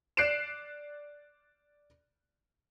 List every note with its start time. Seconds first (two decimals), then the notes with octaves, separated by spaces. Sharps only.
0.17 D5 F#6 C7 D7 E7